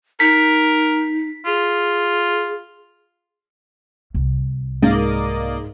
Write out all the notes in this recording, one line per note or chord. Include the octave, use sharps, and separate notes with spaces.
D#4 A#4 B6
F4 G#4
C2
G#2 A#3 D5 D#5